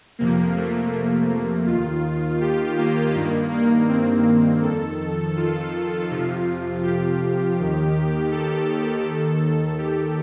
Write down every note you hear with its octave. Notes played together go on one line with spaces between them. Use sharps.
F2 C3 F3 A#3
A3
A#3
A#3
D#2 D#3 F4
G4
A#3
G2 D#3 A#3
A#3
C4
F2 D#3 A4
F4
F2 C3 F3
G4
D#2 D#3
A4
D#2 D#3
G4